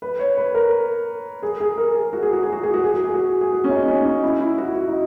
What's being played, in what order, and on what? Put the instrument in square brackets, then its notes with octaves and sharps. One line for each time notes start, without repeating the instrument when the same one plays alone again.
[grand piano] B4
C#5
B4
A#4
G#4
G#4
A#4
G#4
F#4
G#4
F#4
G#4
F#4
G#4
F#4
G#4
F#4
G#4
F#4
G#4
F#4
C#4
D#4
C#4
D#4
E4
E4
F#4
F#4
D#4